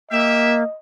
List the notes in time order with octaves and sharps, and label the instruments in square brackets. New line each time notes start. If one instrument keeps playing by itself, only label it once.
[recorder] A#3 [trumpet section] G4 E5 [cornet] D#5